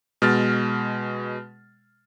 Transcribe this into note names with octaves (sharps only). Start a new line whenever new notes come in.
B2 G#3 F6 A6